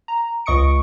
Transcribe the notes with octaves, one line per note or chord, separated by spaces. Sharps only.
A#5
C#2 D#5 C#6 D#6 C#7 D7